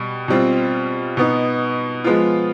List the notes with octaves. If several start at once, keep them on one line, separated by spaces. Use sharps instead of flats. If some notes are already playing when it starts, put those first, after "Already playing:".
Already playing: B2 G3
B2 G3 C4 F4
B2 B3 D#4
F3 G#3 B3 F4